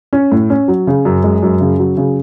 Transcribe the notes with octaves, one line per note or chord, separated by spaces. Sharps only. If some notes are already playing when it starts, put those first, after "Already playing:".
C#4
A2
C#4
F#3
C#3
F#2
G#3
F#2
C#3
F#3
C#3